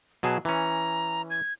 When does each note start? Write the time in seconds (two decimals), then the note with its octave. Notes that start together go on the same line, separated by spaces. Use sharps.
0.23 B2 F#3 G#4 A5
0.45 E3 C#4 A#5
1.30 G#6